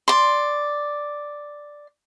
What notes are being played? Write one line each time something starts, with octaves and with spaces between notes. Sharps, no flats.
D5 C6